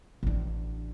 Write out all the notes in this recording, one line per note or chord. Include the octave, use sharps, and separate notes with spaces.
A1 D4